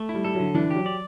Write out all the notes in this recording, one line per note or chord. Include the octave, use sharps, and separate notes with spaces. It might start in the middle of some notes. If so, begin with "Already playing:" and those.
Already playing: A3
E4
G3
G3 A4
F#3
D3
E3 D4
F#3 G4
D5